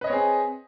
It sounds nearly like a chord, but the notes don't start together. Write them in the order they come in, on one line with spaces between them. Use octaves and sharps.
B4 D#5 C#5 C4 G#4